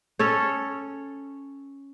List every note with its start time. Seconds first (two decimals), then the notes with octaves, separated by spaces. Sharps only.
0.19 C#4 A4 C#5